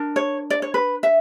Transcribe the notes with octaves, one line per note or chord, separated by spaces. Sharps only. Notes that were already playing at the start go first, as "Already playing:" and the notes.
Already playing: D4 A#4
C#5
D5
C#5
B4
E5